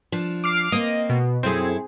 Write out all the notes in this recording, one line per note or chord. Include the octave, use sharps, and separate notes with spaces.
F3 D4
D6 F6 C7
A#3 C4 D#5
B2
F#2 C4 E4 G#4 A4